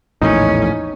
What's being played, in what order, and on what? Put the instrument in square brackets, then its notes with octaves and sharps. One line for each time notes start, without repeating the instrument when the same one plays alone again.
[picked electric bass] A#1 E2 A2 [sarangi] C#4 [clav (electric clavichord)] D#4